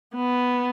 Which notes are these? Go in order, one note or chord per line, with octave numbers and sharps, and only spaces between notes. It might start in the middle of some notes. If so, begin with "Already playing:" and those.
B3